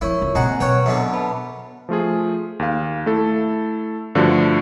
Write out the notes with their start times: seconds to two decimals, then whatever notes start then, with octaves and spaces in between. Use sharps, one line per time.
0.01 F3 C#4 E4 A#4 C#5 C#6
0.22 C#2
0.35 B2 G#3 A#3 C4 F#5 A#5 C#7
0.60 F#3 B4 C#5 F#5 G5
0.86 F#2 B2 D3
1.13 B4 A5 B5
1.89 F3 A3 F4 G#4
2.59 D#2 F5
3.06 A3 E4 A4
4.15 G2 D3 F3 A3 F#4